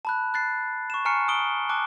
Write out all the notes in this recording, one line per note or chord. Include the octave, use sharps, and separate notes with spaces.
A5 B5 F#6
F#6 A6 C7
C#6 E7
G#5 A#5 C#6 F6 C7 C#7
D#6 D7 G7
A5 D6 F#6